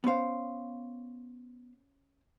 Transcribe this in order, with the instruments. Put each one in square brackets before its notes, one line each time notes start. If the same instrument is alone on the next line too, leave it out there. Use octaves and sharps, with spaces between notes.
[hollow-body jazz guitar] B3 F5 [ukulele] C#4 C5